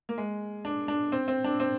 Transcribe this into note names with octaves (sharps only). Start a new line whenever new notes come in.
A#3
G#3
D4
D4
C4
C4
D4
C4